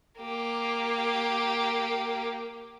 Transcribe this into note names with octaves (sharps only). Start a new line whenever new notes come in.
A#3 G4